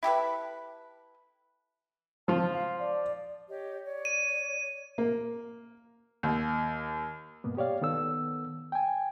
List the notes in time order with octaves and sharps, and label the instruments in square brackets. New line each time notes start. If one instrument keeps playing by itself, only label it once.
[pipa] E4 G4 A4 B4
[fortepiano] F3 F4 [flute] A5
[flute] F5
D5
[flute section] G4 C#5 D#5
C#5 D5
[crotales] D#7
[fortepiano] A#3
D#2
[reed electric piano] G2 B2 A#3 B3
G4 C#5 D5 F5
D#3 B3 A4 E6
G5 G#5